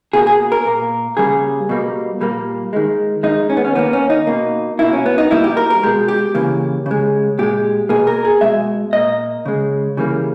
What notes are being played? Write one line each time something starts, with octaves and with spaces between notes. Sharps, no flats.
B2 A#3 G#4
G#4
A#4
A#2 A#3
C#3 G3 A#3 G#4
B2 G3 A#3
A#2 G3 A#3
D#3 G#3
D#3 G#3 D#4
C#4
B3
C#4
D#3 A#3 B3
C#4
D#4
B2 A#3
B2 A#3 E4
C#4
B3
D#4
B2 G3 A#3 E4
G4
A#4
A#4
B2 G#3 G4
G4
C#3 E3 A#3
C#3
G#3
A#2 G#3 G4
B2 A#3 G#4
A#4
G#4
B2 G#3 E5
A#2 A#3 D#5
C#3 G#3
C#3 E3 G3 A#3